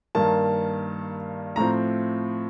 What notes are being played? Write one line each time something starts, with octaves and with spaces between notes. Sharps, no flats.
G2 D#3 A#3 A5
A2 F3 C4 A#5